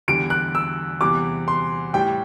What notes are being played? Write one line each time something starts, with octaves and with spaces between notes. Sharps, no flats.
E2 D3 G3 D7
F#6
E6
E2 C3 G3 D6
C6
A2 G3 G5